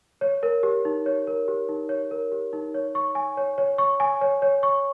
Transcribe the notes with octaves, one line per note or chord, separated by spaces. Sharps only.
C#5
A#4
G4
D#4
C#5
A#4
G4
D#4
C#5
A#4
G4
D#4
C#5
C#6
G#5
C#5
C#5
C#6
G#5
C#5
C#5
C#6